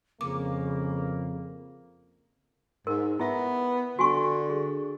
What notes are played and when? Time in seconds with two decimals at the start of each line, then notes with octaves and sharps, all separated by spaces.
0.21 F2 C#3 A#3 D6
2.87 G#2 A#4
3.20 B3 E4 E5
3.99 D3 F#4 G#5 C#6
4.50 G#4